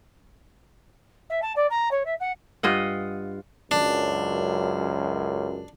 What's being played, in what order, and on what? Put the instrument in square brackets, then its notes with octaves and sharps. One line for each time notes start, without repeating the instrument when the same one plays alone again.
[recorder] E5
A5
D5
A#5
C#5
E5
F#5
[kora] G2 F4 D#5 F#5
[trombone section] C#2 F#2 [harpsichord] D4